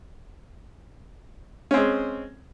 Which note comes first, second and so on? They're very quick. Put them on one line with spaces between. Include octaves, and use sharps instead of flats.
C#4 C4 G#3